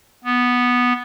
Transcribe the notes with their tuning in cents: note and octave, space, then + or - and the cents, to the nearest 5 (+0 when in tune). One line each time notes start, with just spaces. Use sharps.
B3 -5